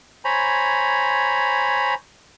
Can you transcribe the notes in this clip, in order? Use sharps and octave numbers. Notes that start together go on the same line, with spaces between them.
C5 C#5 G#5 A#5 B5